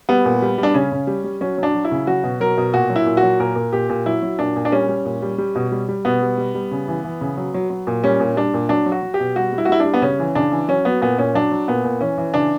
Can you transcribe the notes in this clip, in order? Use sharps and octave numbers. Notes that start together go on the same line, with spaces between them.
G3 B3
A#2
G3
G3
D4
C#3 C#4
C#3
G3
G3
F#3 C#4
F#3
D4
F#3
E4
C#3
F#3 F#4
B2
F#3 A#4
B2
A#2 F#4
F#3
E4
A#2
F#4
F#3
A#2 A#4
A#2
A#2 G4
A#2
F#3 E4
F#3
A#2 D4
A#2
D4
G3 C#4
G3
A#2
G3
G3
B2
G3
G3
B2 B3
G3
G3
G3
C#3
E3
E3
C#3
F#3
F#3
F#3
A#2
G3 C#4
A#2
G3 D4
A#2
F#3 D4
F#3
F#4
F#3
G4
B2
G3 F#4
G3
E4
F#4
G3 E4
D4
G3
B3
C#3 C#4
E3
C#3 D4
E3
F#3 C#4
F#3 B3
A#2 B3
A#2 C#4
F#3 D4
F#3
A#2 B3
A#2
E3 C#4
E3
C#3 D4